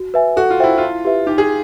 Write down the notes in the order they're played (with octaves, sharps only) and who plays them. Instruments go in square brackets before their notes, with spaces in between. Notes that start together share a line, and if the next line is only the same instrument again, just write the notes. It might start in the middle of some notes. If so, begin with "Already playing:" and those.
Already playing: [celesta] F#4
B4 E5 G#5
[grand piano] F#4 [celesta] A4
[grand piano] F4
[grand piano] E4 [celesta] C5 E5 G5
[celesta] E4 [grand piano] F4
[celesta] G4 B4 E5
[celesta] D#4 [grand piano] G4
[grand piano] G#4